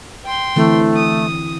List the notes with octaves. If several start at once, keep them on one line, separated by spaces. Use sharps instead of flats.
G5 C6
D3 E3 A3 C4
D#6